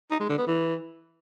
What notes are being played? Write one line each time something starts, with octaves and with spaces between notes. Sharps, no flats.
D#4
G#3
D3
B3
E3